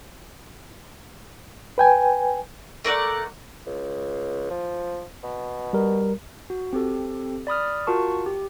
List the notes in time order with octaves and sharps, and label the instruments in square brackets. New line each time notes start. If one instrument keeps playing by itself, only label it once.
[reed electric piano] B4 G5 G#5
[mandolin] A3 A#4 D5 F#5
[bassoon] C#2
F3
B2
[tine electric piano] G3 A#4
[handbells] F#4
C4 G4 A4
D5 B5 D#6 F6
F4 F#4 A#4 A5 C#6
G4